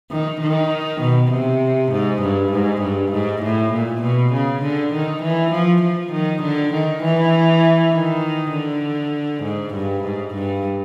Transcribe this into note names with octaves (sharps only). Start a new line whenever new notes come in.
D#3
D#3
B2
C3
G#2
G2
G#2
G2
G#2
A2
A#2
B2
C#3
D3
D#3
E3
F3
F3
D#3
D3
D#3
E3
D#3
D3
G#2
G2
G#2
G2